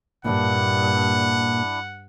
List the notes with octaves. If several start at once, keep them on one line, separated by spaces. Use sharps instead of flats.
G2 A#2 A#3 D4 E4 F#5